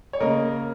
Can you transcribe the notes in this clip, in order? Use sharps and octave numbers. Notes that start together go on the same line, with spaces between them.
C#5
C#3 A#3 A#4 D#5